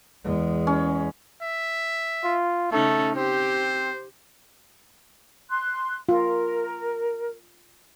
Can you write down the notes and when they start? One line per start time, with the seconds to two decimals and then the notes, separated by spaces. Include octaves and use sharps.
0.24 E2 G#3
0.67 C#4
1.42 E5
2.24 F4
2.72 C#3 A3 C#4 D#4 A4
3.16 C4 G4 C5
5.50 C6 F#6
6.09 F4 A#4